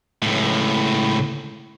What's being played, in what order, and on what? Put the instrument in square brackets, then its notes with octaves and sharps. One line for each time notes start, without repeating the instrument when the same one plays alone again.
[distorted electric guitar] C#2 A2